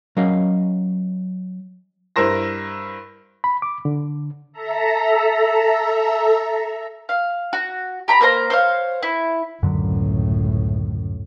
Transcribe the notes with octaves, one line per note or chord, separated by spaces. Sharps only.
F#3 C#4 A#4 D#5 F5
G2 E4 A#4 C5 A#6
B5
D6
D3
A4 E5 A#5
F5
F#4
G4 A#5 B5
A#3 A#4 C5 A#5
C5 C#5 F5
E4
C#2 F#2 A2 D3 F#3